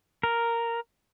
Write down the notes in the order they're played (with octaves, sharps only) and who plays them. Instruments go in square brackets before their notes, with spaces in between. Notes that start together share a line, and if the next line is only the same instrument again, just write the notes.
[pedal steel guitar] A#4